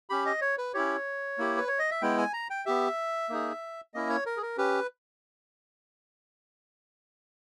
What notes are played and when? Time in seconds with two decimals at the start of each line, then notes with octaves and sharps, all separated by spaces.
0.10 C#4 G4 B5
0.26 D#5
0.41 C#5
0.58 B4
0.74 C#4 E4 G4 C#5
1.38 A#3 E4 G4
1.57 B4
1.68 C#5
1.79 D#5
1.91 E5
2.02 G#3 B3 E4 G5
2.18 G#5
2.33 A#5
2.50 G5
2.66 B3 G4 E5
3.29 A#3 D#4 G#4
3.94 A#3 C#4 E4 D#5
4.10 C#5
4.26 A#4
4.37 G#4
4.42 A#4
4.58 C#4 G4 B4